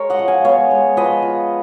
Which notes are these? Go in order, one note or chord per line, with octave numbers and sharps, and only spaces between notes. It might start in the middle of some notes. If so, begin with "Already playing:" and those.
Already playing: G#3 G#4 A#4 C#5
D#5 F#5
F3
F5 G#5
B3 C#5 F5
G#3
F3 B4 D#5
F3